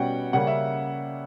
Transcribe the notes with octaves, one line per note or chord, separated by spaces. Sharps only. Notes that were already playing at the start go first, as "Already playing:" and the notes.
Already playing: B2 G3 C#4 F#5 G5
C#3 G3 A#3 C#4 F#5
E5